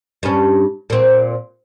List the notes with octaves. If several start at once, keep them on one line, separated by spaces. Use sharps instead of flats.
G2 C#4
A#2 C4